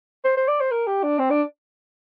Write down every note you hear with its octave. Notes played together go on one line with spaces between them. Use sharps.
C5
C5
D5
C5
A#4
G4
D4
C4
D4